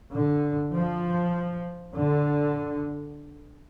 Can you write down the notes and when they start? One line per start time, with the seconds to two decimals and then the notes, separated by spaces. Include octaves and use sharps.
0.13 D3
0.73 F3
1.94 D3